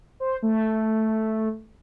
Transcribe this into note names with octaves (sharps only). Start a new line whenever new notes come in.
C5
A3